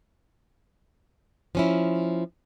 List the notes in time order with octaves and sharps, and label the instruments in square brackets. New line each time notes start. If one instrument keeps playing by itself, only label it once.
[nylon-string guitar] F3 C#4 E4